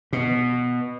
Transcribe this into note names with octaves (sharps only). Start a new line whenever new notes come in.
B2